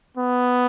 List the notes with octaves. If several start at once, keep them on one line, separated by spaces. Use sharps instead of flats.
B3